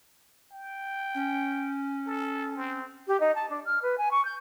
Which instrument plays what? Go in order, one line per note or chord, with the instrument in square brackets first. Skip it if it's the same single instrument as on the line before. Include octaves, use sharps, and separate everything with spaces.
[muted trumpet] G5
[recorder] C#4
[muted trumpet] A4
C4
[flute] G4
D#4
A5
D4
F6
B4
G#5
C#6
G6